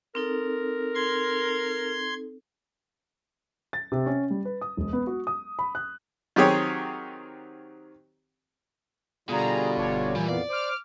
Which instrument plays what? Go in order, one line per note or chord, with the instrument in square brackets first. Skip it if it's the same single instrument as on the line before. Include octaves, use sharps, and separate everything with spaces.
[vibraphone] C4 D#4 A4 [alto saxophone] A#4
[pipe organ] C6 G#6
[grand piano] A6
C3
C#4
G3
B4
D#6
E1
B3
F#4
D#6
B5
F#6
[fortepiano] D#3 F#3 C4 G4 G#4 C#5
[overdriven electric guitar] B2 [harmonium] D3 G3 F4 [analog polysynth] G#4 A#5
[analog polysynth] G1 D4 C#5
[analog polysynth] A#2 E3 [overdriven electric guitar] G3 [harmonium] G#5
[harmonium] F2 B3 F5 [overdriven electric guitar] D5
[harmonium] C5 [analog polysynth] D6 F6